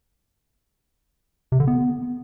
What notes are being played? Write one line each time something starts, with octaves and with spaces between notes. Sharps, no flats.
C3
D3
B3